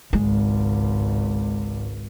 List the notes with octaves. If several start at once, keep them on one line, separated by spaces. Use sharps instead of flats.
G#1 C#2 G#3